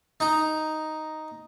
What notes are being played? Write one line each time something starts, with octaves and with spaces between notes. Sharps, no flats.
D#4 A#5